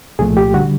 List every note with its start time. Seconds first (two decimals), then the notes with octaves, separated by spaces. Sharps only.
0.19 C2 A#2 F3 A3 G#4
0.37 G4
0.54 D3 G3 F#4